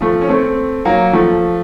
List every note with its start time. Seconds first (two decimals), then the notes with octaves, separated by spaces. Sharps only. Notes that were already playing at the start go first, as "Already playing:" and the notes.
0.01 F3 A3
0.21 C#4
0.29 A3 C4
0.85 F#3 A#3
1.13 F3 A3